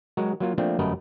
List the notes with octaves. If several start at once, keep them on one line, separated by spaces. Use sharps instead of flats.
F#3 G#3 F#4 A#4
F#3 A#3 F4
F3 A3 A#3 C4 D4
G1 F#2 A3 A#4 B4 D#5